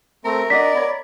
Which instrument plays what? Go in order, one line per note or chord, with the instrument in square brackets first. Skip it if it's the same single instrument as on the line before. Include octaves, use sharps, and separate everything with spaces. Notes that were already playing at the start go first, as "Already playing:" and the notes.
[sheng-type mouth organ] A3 C4 A#5 [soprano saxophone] A#4
[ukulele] D4 F#4 D#5 [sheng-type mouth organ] D5 [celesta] B6
[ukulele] C#5 B5